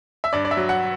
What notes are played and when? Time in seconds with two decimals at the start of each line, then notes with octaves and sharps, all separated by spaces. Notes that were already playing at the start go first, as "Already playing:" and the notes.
0.24 E5
0.33 G2 D5
0.45 D5
0.51 E5
0.57 F#3
0.69 F#5